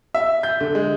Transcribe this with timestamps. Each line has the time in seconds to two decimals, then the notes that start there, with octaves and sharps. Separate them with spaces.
0.14 E5
0.43 G6
0.60 D3
0.75 G#3